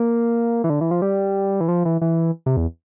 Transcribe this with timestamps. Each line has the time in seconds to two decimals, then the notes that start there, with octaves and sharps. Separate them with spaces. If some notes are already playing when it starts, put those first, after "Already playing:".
Already playing: A#3
0.64 E3
0.70 D3
0.81 E3
0.91 F3
1.02 G3
1.60 E3
1.68 F3
1.85 E3
2.01 E3
2.46 C3
2.57 E2